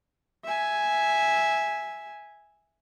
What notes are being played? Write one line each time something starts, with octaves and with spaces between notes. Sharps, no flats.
E5 G#5